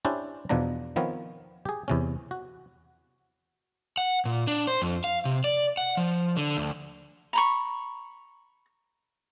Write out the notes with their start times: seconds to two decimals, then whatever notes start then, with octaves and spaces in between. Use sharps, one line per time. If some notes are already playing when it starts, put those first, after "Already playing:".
0.05 C#4 D4 E4 G4 C5 D5
0.49 E2 B2 F3 D4 A#5
0.96 D#3 F3 B3 C4 A#4 C#5
1.65 G4 G#4
1.88 E2 C3 C#4
2.31 F#4
3.98 F#5
4.25 A#2
4.47 D4
4.67 C5
4.82 F2
5.04 F5
5.25 C3
5.44 D5
5.77 F#5
5.97 F3
6.37 D3
6.57 D2
7.33 A#5 B5 C#6